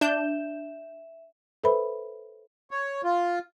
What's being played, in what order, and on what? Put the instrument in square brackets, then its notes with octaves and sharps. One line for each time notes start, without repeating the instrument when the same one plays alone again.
[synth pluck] D4 G6 [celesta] E5 E7
[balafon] A4 B4 C5 E5 B5
[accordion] C#5
F4